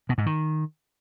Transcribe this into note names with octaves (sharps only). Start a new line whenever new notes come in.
B2
G#2
D#3